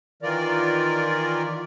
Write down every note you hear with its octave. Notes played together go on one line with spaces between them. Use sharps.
D#3 E3 F4 A#4 D5